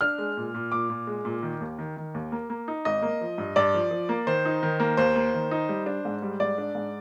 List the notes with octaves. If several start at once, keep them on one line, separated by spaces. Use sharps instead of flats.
D4 F6
G#3
A#2
A#2
A#2 D6
A#2
G#3
A#2
D#3
D#2
D#3
D#3
D#2
A#3
A#3
D#4
G#1 D#5
A#3
F3
G2
G2 D5
F3
F3
A#3
D#3 C5
D#4
D#3
A#3
D#2 C5
A#3
D#3
D#4
G3
D4
G#2
G3
G#2 D5
D4
G#2